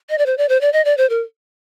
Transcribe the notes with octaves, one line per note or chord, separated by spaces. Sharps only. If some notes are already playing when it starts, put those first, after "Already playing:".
D#5
D5
C5
D5
C5
D5
D#5
D5
C5
A#4